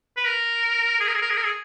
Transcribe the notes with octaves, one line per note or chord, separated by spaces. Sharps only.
B4
A#4
G#4
A#4
G#4
A#4
G#4
A#4
G#4